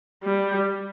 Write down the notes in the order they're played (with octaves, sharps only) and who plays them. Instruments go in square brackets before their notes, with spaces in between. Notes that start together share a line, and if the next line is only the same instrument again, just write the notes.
[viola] G3